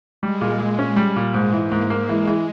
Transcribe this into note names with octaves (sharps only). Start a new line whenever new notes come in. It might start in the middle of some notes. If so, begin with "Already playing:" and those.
G3 G#3
A#2
A#2
C#4
G3
A#2
G#2 G#3
E3
A#3
G#2
G#3 A#3
E3
E3